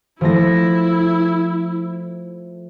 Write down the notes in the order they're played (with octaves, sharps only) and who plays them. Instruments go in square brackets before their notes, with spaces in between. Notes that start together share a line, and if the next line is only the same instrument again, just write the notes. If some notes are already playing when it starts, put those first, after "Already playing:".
[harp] F3 A3 A#6 [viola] E4